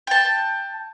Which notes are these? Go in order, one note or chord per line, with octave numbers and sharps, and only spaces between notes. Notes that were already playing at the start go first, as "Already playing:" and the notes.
G5 A5